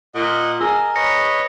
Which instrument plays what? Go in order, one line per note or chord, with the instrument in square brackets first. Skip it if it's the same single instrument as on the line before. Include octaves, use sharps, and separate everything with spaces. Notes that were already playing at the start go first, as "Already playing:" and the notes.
[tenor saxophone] A#2 [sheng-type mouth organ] D#5 F#5
[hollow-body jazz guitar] G#4 [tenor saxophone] A#4 [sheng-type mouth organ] D#5 [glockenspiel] E6
[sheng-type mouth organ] B4 C#5 D#5 [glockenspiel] A#6 C#7